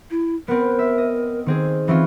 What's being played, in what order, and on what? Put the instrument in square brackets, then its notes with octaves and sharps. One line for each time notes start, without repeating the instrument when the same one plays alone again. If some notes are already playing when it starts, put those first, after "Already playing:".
[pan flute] E4
[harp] B3 C4 [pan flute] A#4
[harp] E5
D#5
D#3 C4 G#4
[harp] E3 C#4 F4 [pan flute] C4